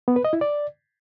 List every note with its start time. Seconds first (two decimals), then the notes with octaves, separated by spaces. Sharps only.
0.08 B3
0.16 B4
0.25 D#5
0.33 E4
0.41 D5